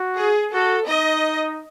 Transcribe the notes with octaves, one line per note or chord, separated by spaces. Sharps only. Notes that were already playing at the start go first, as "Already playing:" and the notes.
Already playing: F#4
G#4
F#4 A4
D#4 D#5